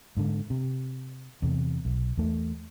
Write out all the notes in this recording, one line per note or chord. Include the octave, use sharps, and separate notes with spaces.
G#2 D3
C3
E2 C3
B1
E2 A3